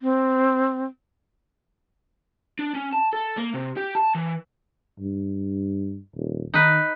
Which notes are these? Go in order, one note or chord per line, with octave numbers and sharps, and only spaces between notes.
C4
D4
C#4
A5
A4
A#3
C3
G4
A5
E3
G2
D#1
D#3 D#4 B4